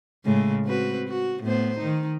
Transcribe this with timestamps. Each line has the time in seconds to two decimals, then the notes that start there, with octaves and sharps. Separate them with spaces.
0.25 A2 C#3 G#3
0.65 C4 F#4 B4
1.08 F#4
1.43 A2 B3 C5
1.79 D#3 D#4